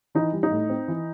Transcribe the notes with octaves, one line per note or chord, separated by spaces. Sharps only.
E3 D#4
G3
D#4
A2
C4
E3